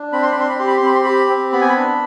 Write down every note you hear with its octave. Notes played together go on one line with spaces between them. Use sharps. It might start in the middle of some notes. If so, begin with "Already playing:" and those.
Already playing: D4
C4 B5
C6
B5
C4 C6
B5
G4 C6
B5
C6
C4 B5
C6
G4 B5
C4
B3 B5
G#5
B5
D4